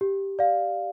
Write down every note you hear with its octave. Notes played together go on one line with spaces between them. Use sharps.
G4
D5 F5